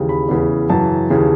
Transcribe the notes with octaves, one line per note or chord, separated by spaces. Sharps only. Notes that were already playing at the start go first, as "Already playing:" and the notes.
Already playing: D#2 C#3 E3
B5
E2 C#3 E3
F#2 C#3 E3 A5
D#2 C#3 E3